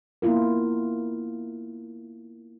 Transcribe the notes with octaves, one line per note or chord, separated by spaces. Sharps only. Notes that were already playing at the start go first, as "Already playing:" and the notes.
A#3 B3 E4 F4 A#4